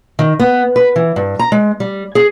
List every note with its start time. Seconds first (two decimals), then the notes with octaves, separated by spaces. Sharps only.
0.19 D#3
0.40 B3
0.76 B4
0.96 E3
1.16 G2
1.39 A#5
1.52 G#3
1.80 G3
2.15 G#4